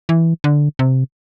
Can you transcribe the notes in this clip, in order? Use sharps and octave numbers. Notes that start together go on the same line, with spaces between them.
E3
D3
C3